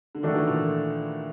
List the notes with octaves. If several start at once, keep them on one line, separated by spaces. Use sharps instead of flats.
D3
D#3 F#3 A3 D4 F#4 A4
E3
A#2